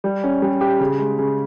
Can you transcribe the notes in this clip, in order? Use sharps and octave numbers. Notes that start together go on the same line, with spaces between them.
G3
C#4
G3
G4
C#3
G#3
C#3